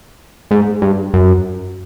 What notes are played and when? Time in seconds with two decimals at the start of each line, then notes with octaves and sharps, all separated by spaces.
0.51 G#2
0.82 G2
1.14 F#2